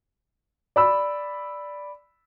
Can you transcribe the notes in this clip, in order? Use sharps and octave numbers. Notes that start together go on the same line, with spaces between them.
D5 B5 E6